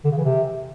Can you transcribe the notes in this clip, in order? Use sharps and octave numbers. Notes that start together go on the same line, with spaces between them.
D3
C#3
E3
C3